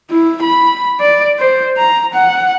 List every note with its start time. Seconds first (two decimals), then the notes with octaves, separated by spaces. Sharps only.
0.10 E4
0.42 B5
1.00 D5
1.39 C5
1.78 A#5
2.14 F#5